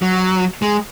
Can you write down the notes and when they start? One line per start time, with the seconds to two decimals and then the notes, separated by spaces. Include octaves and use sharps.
0.02 F#3
0.62 G#3